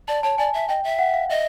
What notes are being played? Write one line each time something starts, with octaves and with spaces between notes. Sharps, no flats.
D5 A5
C#5 A5
D5 G#5
E5
D#5 G5
E5
F#5
F5
D#5 E5